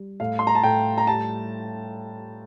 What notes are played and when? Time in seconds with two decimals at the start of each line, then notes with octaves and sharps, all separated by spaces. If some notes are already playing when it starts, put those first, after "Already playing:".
Already playing: G3
0.20 A2 F5
0.39 C6
0.47 A#5
0.55 A5
0.63 A2 G5
0.98 A#5
1.07 G3 A5